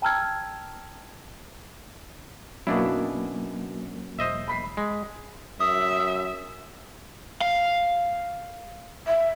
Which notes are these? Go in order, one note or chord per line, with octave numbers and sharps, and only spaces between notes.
G5 A5 A#5 E6 F6 G#6
F#2 B2 F#3 A#3 C#4 D4 E4
E1 C5 D#5 E5
B5 B6 C7
G#3
F#2 E5 D#6
F5
E5